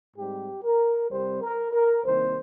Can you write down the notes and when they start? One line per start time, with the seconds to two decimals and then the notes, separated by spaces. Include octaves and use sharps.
0.17 G#2 G3 C4 G4
0.64 A#4
1.10 C2 C3 G3 C4 C5
1.41 A#4
1.72 A#4
2.03 C2 C3 D#3 G3 A#3 C5